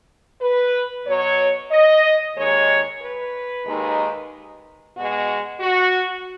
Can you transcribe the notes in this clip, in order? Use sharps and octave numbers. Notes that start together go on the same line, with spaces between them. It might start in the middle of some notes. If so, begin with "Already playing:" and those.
B4
B2 F#3 C#5
D#5
D#2 D#3 G#3 C#5
B4
D#2 D#3 G#3
B2 G#3 F#4
F#4